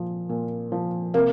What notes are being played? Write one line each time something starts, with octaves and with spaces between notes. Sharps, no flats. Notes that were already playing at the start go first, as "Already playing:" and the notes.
Already playing: A#2 F3
A#2
F3
C3 A#3